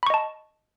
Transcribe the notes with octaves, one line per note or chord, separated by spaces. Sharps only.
D#5 A5 B5 C#6